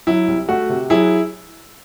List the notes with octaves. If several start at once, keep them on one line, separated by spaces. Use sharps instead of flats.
F#3 E4
C2
A3 F#4
C3
F#3 E4 G#4